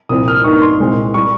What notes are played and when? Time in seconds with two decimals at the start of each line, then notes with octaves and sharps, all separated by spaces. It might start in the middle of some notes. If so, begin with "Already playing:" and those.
0.09 C2 A#2 F3 C4 D#6
0.28 F6
0.44 G2 D#3 A#3 D#4 C#6
0.62 C6
0.80 C2 A#2 G#3 C4
1.14 G3 C#6